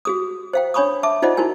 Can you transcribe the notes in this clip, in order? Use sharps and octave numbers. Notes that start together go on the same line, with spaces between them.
F#4 G#4 D#6
C5 F5 G5
D4 C#5 G#5 B5 C#6 D#6
E5 A5 D6
D#4 F4 C5 D5 D#5 F#5
D#4 E4 F#4 A#4 G#5